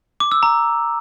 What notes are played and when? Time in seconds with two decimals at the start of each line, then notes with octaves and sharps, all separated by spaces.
0.20 D6
0.32 E6
0.43 A#5